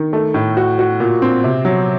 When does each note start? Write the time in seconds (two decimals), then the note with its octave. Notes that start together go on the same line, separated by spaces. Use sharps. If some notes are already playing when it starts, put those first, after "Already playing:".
Already playing: D#3
0.13 A3
0.34 A2
0.57 F#4
0.79 F#4
1.00 A#2
1.22 C4
1.44 C3
1.65 F#3